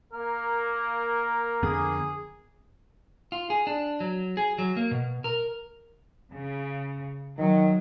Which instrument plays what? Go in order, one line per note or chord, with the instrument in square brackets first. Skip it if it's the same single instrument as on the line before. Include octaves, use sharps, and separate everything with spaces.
[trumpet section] A#3 [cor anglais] A#4
[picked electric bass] F2 D3 B3 [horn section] G#4
[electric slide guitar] F4
G#4
D4
F#3
G#4
F#3
A#3
B2
A#4
[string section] C#3
[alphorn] D#3 [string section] F#3